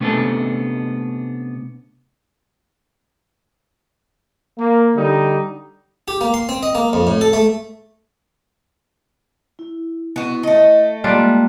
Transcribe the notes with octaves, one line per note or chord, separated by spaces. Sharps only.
C3 A3 B3 C#4 D4 A4
A#3
D3 G3 D#4
G4
A#3
C6
C4
D#5
A#3
F2
A2
A4
A3
E4
B3 E4 F#4
A3 D#5
G3 G#3 A#3 D4 F4